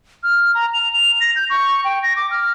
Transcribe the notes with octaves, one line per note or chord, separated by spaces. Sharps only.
F6
A#5
F7
F7
A#6
G6
C#6
G5
A#6
D6
F6